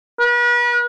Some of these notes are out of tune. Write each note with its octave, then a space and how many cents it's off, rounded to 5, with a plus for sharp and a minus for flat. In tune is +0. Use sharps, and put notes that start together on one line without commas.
B4 -40